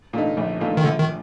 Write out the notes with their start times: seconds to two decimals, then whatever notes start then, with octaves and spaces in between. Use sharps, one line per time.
0.13 A#2 A3 D#4
0.37 A#1
0.60 A#2 A3 D#4
0.77 D#3
0.84 A#1 D3
1.00 D#3